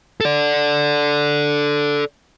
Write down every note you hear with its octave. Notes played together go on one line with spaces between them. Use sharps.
A4 D5